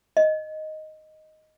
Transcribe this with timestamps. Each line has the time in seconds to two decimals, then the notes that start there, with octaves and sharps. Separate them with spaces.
0.17 D#5